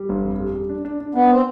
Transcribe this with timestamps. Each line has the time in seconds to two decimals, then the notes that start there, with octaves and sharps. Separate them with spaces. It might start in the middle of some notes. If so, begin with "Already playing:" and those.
Already playing: G3
0.09 G1
0.24 F2
0.40 G3
0.55 G3
0.69 D4
0.85 D4
1.01 D4
1.15 B3 D4
1.31 C4